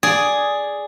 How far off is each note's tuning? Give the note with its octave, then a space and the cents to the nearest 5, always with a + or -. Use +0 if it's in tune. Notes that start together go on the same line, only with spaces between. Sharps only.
G#4 +0 D5 +0